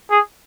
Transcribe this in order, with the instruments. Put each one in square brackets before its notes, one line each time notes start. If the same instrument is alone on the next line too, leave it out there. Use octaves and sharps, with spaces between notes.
[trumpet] G#4